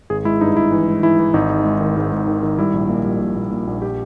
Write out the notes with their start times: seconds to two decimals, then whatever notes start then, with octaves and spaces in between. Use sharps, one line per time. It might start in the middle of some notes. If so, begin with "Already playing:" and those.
0.10 G#1 G#4
0.25 G#3 E4
0.41 G2 D#4
0.57 G2 E4
0.72 E3
0.88 G#3
1.03 E3 E4
1.19 E3
1.34 G#1 D#4
1.49 G#3
1.65 G#3
1.81 D#3
1.97 G#2
2.12 G#2
2.28 D#3
2.43 D#3
2.59 G3 E4
2.74 A#1
2.89 A#2
3.04 G3
3.20 A#2
3.36 A#2
3.51 A#2
3.67 A#1
3.82 G4